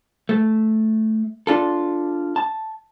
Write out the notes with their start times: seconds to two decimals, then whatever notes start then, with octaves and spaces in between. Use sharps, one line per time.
0.29 A3
1.47 D4 F4 A4
2.36 A5